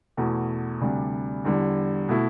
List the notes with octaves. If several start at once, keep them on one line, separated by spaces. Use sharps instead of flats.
E2 B2 A3
D2 C3 G3 D4
E2 D3 G3
B2 A3 E4